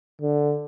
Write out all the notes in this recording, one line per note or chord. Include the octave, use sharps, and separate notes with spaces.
D3